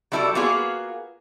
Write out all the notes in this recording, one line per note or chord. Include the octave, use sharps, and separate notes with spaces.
F#3 G3 E4 A4 C#5 D5
A#3 B3 F4 F#4 G#4